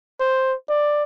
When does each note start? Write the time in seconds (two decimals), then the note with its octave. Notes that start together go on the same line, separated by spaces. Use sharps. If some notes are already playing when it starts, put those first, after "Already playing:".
0.20 C5
0.69 D5